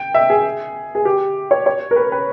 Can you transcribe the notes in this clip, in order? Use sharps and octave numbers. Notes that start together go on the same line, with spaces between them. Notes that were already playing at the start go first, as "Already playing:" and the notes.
Already playing: G5
E5
G#4
G#4
G4
C#5
C#5
A#4
B4
B4